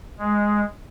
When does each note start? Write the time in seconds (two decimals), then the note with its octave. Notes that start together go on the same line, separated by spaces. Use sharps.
0.18 G#3